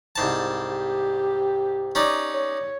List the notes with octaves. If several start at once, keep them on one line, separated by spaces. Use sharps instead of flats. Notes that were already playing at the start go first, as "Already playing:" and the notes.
C2 G#2 A5
G4
C#4 D#4 D5
C#5